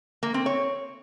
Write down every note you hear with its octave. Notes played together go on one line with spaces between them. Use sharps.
A#3
C4
C#5